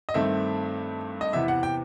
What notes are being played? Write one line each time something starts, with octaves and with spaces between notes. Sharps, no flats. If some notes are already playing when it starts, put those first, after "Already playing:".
D#5
G2 D#3 A3 C4 E5
D#5
E2 C3 E3 B3 E5
F#5
G5